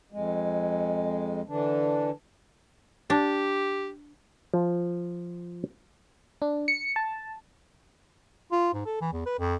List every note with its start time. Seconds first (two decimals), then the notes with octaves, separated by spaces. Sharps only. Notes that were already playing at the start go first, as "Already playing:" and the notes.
0.12 F2 G#3
1.49 D3 E3 D4
3.10 D4 G4
4.54 F3
6.42 D4
6.68 C#7
6.96 A5
8.52 F4
8.74 G#2
8.86 A4
9.01 E3
9.13 E2
9.26 B4
9.39 F2